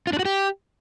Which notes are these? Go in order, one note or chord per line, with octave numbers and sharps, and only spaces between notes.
F4
D4
F#4
G4